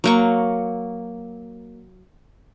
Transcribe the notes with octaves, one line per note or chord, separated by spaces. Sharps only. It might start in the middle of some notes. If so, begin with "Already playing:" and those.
F#3 A#3 C#6